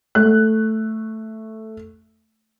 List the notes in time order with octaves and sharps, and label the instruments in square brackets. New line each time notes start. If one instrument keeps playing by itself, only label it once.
[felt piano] A3 F#6